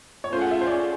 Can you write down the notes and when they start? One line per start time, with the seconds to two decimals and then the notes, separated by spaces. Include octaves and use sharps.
0.24 C#5
0.32 A3 C#4 F4 G#4 C5
0.41 F#5
0.51 E5
0.61 C5
0.67 D5
0.71 C#5